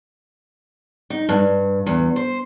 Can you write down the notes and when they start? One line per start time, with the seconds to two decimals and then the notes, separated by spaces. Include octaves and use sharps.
1.10 D#4
1.29 G2
1.86 E2
2.16 C5